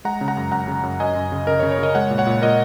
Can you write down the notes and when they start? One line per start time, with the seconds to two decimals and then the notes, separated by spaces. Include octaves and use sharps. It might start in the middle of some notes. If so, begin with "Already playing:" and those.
0.05 G#3 F#5 A#5
0.21 C#3
0.28 F#5 A#5
0.37 F#2
0.52 F#2 F#5 A#5
0.68 C#3
0.83 F#2
1.00 F#2 D#5 G#5
1.16 F#2
1.32 C#3
1.47 C#3 A#4 D#5
1.59 C#5
1.63 C#3
1.71 C#5
1.79 C#3 A#4 D#5
1.95 G#3 C#5 F#5
2.10 A#2
2.18 C#5 F#5
2.27 A#2
2.42 A#2 A#4 D#5